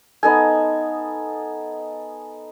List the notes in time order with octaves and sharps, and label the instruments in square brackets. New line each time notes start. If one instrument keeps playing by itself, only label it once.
[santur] B3 D#4 A4 G#5